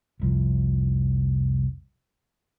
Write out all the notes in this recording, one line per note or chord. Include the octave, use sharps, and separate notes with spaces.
F1 C2 F3